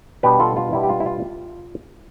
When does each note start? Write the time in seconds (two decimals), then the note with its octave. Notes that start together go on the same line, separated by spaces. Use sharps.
0.23 B2 G3 B3 D4 G4 B4
0.40 F4 A4
0.57 F4
0.73 B2 G3 B3 D4 E4
0.83 G4
0.89 F4
1.00 E4
1.06 F4